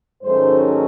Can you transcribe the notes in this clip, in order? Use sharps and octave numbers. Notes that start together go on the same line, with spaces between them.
G#2 D#3 F#3 A3 C#4 C5